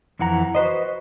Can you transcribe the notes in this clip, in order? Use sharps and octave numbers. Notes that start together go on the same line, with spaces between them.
F2 E3 F#5 A#5
F#4 B4 C5 D#5